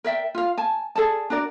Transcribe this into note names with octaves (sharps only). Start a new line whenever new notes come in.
A#4 D5 E5 G5
F4 F5
G#5 A5
G#4 A4 D5 A5
D4 F#4 A#4 D5